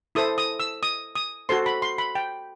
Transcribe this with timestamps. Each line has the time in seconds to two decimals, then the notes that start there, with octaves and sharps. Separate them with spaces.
0.15 E4 A4 C5 D#6
0.38 D#6
0.60 E6
0.83 D#6
1.15 D#6
1.49 F#4 A4 C5 C6
1.66 B5
1.82 C6
1.98 B5
2.15 G5